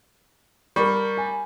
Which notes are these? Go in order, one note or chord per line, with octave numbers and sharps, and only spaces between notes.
G3 A#4 C#6
G#5